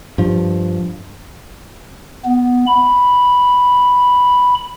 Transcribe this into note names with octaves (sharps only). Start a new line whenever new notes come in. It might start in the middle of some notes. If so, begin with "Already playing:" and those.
G2 F3
B3
B5